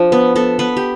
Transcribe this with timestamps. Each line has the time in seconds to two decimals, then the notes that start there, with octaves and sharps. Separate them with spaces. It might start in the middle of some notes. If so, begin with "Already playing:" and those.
Already playing: F3 D4
0.12 B3
0.36 B3 A4
0.59 B3 B4
0.77 G4